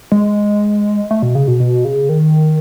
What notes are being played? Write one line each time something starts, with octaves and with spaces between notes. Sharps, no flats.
G#3
A3
B2
C#3
B2
B2
C#3
D#3